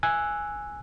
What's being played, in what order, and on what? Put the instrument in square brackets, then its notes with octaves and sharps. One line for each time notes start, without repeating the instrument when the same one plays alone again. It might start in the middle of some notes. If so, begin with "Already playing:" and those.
[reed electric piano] G#5 E6 F#6